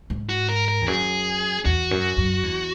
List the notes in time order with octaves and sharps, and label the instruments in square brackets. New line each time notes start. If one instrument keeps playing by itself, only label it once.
[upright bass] G#2
[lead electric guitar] F#4
A#4
A#4
[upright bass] E2
[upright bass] F#2 [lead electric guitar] G#4
[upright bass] E2 [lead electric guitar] F#4
[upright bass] F#2
F#2
E2